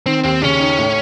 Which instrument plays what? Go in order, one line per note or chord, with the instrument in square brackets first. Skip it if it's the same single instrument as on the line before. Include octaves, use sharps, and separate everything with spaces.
[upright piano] D#3 [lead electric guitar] C4
[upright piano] D#2 [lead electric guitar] C4
[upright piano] C#3 [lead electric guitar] C#4
[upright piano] D#4
A2